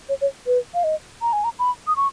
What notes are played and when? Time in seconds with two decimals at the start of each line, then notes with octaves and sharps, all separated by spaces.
0.09 C#5
0.21 C#5
0.47 B4
0.74 F5
0.84 D#5
1.22 A#5
1.33 G#5
1.44 A#5
1.59 B5
1.87 D#6
1.96 C#6